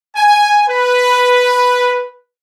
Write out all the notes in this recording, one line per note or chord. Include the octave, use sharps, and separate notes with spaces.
G#5
B4